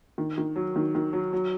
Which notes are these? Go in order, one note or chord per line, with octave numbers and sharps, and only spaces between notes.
D#3
D#3
F#3
D#3
D#3
F#3
F#3